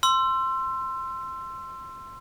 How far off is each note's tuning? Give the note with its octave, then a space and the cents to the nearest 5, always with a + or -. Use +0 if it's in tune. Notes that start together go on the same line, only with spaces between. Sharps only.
C6 +0 E6 +30